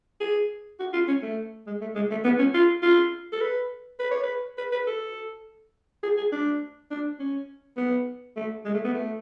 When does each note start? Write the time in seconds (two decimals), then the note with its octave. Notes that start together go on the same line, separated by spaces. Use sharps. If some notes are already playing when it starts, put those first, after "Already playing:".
0.20 G#4
0.80 F#4
0.93 F4
1.08 C#4
1.22 A3
1.67 G#3
1.81 A3
1.95 G#3
2.11 A3
2.24 B3
2.39 C#4
2.54 F4
2.83 F4
3.33 A4
3.41 B4
3.99 B4
4.11 C#5
4.23 B4
4.58 B4
4.72 B4
4.87 A4
6.03 G#4
6.17 G#4
6.32 D4
6.91 D4
7.20 C#4
7.77 B3
8.37 A3
8.65 G#3
8.74 A3
8.85 B3
8.94 A3